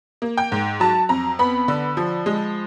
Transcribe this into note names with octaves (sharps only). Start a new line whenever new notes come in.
A#3
G5
G#2
F#3 A5
F2 A#5
B3 B5
D3
F3
G#3